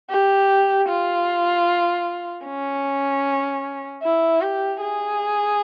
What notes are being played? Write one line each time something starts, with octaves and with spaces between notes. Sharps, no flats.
G4
F4
C#4
E4
G4
G#4